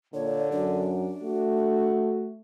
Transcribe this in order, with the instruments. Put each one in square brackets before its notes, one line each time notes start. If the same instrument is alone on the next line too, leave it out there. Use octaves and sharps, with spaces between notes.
[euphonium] A#2 [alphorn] D3 [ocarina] C#5
[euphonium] F#2 [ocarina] D4
[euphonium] A3 [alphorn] F#4